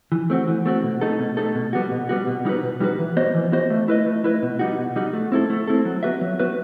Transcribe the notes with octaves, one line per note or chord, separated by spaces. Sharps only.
E3
A3 C4 F#4
E3
A3 C4 F#4
B2
A3 D#4 A4
B2
A3 D#4 A4
B2
G3 B3 F#4
B2
G3 B3 F#4
B2
G3 D#4 F#4 B4
B2
G3 D#4 F#4 B4
E3
B3 F#4 C5 D#5
E3
B3 F#4 C5 D#5
A3
E4 B4 D#5
A3
E4 B4 D#5
B2
G3 D#4 F#4
B2
G3 D#4 F#4
A3
C4 E4 A4
A3
C4 E4 A4
F#3
B3 F#4 B4 E5
F#3
B3 F#4 B4 E5